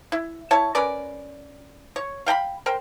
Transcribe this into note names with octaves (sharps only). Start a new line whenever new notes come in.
E4
E4 C#5 A5
C#4 A#4 B4 D5
C#5
F5 G5 A#5 B5
A#4 C5 G5